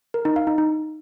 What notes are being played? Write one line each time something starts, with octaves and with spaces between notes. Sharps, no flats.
A#4
D#4
F5
D#4
D#4